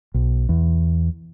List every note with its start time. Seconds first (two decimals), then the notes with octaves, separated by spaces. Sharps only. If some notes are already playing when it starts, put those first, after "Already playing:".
0.14 B1
0.49 E2